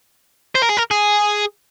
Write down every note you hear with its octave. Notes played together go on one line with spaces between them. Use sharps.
C5
A#4
G#4
A#4
G#4